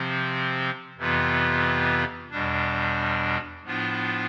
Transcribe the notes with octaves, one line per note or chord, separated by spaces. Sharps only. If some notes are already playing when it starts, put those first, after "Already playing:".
Already playing: C3 F3 C4
F2 C3 E3 B3 F4
E2 B2 G3 D4
A2 F3 B3 D4 F4